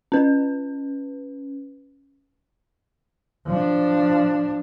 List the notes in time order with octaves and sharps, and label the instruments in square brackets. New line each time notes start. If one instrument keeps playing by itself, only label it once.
[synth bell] C#4 B4
[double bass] F3 D4